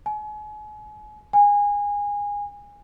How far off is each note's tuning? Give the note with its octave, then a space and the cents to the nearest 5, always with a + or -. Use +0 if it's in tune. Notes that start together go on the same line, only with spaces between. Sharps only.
G#5 +35
G#5 -20